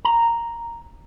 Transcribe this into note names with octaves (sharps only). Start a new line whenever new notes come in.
A#5